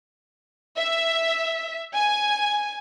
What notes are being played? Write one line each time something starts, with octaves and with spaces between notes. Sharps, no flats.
E5
G#5